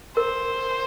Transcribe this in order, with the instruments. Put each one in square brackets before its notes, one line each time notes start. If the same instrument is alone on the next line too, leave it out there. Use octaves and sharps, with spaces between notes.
[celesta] A#4 [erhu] C5